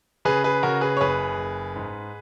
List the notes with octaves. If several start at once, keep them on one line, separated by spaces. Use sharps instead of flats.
C#3 G#4 B4
G#4 B4
C#3 F#4 A#4
G#4 B4
C#5
F#1 G#4 B4
F#1
G#2